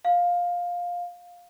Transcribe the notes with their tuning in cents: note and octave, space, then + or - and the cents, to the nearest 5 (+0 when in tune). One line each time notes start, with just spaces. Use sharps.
F5 +15